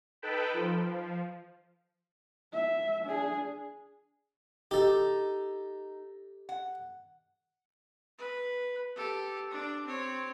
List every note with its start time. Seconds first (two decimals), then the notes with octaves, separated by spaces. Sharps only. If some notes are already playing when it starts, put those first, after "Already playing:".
0.22 D#4 A4 B4 G5 A5 B5
0.53 F3
2.53 E5
3.05 D4 G#4
4.71 D#4 G4 A4
6.49 F#5
8.18 B4
8.95 G4 A4
9.50 D4
9.86 C4 C#5